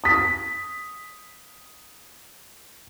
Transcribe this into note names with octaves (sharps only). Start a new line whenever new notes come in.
D#6 B6